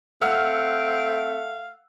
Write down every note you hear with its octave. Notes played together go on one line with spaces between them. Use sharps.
A3 C4 F5 F#5 E6 F6